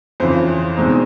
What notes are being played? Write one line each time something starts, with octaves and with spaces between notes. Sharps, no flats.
F2 C#3 E3 C5
E2 B2 G#3 C4 D#4